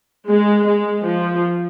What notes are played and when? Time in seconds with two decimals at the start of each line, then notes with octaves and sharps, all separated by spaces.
0.29 G#3
0.67 G#3
1.06 F3